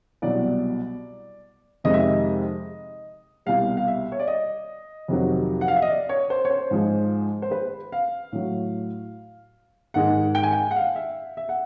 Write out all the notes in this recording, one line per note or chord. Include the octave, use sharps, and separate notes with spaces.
C2 B2 F#3 D5
F2 C3 D#3 G#3 D#5
E5
D#5
C2 B2 G3 F5
F5
E5
C#5
D5
D#5
F2 C3 D#3 F#3
F#5
F5
E5
D#5
D5
C#5
C5
C#5
C5
G#2 F3 G#3
C5
B4
F5
A2 F#3
G#2 D#3 G#3 F#5
G5
G#5
G5
F#5
F5
E5
E5
F#5